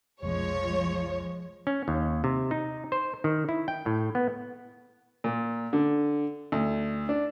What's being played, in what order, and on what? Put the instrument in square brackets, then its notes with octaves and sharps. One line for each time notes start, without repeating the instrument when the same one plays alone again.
[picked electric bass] F1 B1 [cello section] F3 G#3 [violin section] C#5
[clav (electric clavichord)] C#4
D#2
C3
D#4
C5
D#3
E4
G5
A2
B3
[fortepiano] A#2
D3
D2
D4